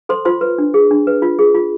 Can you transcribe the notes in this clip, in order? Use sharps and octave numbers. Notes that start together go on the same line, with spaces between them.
A4 C5 C6
F4 C5 C6
B4
D4
G#4
D4
B4
F4
G#4
F4